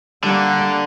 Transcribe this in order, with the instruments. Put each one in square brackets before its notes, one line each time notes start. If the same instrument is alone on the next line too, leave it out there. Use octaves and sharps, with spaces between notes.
[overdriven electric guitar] D3 [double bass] G3 [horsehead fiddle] A#3 F#5